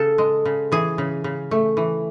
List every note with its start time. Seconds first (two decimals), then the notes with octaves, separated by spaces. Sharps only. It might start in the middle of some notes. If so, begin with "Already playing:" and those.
Already playing: C#3 A4
0.18 G#3
0.45 C#3
0.72 E3 G#4
0.98 C#3
1.24 C#3
1.51 A3
1.77 E3